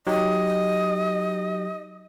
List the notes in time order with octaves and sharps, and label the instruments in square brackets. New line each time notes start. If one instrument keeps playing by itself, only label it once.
[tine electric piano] F#3 D#4 G4 [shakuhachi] D#5